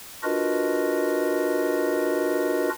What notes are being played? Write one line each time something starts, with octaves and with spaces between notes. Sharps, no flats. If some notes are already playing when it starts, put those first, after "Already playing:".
D4 F4 F#4 A#4 B4 D#5